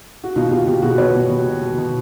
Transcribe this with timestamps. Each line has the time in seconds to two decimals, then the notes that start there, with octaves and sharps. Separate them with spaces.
0.24 F#4
0.36 B2 D#4 F4
0.51 B2 F4 G4
0.67 B2 F4 G4
0.82 B2 F#4 G#4
0.98 B2 B4 C#5
1.15 B2
1.30 B2
1.46 B2
1.61 B2
1.78 B2